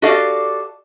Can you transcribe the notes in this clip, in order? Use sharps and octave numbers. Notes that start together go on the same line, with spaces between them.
F#4 G4 A4 D5 D#5 F5